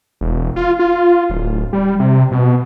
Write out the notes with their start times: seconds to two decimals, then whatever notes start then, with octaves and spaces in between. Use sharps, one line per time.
0.21 E1
0.56 F4
0.79 F4
1.30 D1
1.73 G3
2.00 C3
2.31 B2